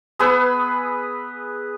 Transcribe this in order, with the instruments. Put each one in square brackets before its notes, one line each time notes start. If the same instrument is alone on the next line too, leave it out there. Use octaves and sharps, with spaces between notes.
[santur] B3 G#4 B4 E6